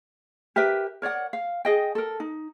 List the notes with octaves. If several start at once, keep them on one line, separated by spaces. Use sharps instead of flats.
G4 A#4 B4 E5
A#4 C#5 D5 F#5
F5
G#4 D#5 G5
A4 A#4
D#4